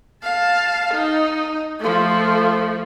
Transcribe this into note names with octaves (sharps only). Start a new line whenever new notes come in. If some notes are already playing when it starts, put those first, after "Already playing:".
F5 A5
D#4
F3 A3